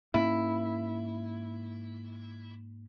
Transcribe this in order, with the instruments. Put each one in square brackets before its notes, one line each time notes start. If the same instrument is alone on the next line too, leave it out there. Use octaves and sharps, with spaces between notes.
[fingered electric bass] G#2 A#3 C#4 [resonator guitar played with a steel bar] E4